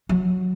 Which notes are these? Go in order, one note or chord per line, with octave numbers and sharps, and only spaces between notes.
F#3